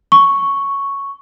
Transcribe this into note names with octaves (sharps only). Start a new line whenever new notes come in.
C#6